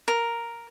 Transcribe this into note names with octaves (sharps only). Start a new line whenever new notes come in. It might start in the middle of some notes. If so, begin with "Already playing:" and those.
A#4